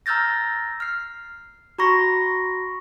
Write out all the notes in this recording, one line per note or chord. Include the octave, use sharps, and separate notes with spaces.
A#5 E6 F6 G6 A6 A#6
F6 C7
F#4 A#5 B5 C#6 A#6